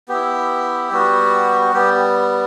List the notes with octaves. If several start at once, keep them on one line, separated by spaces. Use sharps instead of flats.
B3 E4 G4
G3 B3 F#4
G3 B3 G4